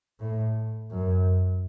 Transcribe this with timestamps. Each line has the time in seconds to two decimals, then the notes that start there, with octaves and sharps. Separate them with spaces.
0.20 A2
0.91 F#2